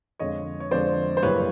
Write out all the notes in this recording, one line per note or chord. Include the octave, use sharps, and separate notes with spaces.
F2 D3 F3 G#3 C#5 D#5
C#5
F2 D3 F3 G#3 C5 D5
C5
F#1 F#2 C#3 E3 G3 B4 C#5